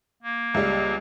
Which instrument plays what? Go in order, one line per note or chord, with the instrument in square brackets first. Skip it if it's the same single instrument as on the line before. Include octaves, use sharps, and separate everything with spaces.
[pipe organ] A#3
[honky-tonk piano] C#2 G3